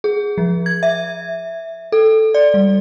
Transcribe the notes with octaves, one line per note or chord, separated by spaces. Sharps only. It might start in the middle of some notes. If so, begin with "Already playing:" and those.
G#4
F3
G#6
E5
A4
D5
G3